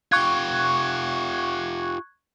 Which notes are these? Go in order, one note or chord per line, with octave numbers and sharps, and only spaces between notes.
F4 G4 C#6 F#6 G#6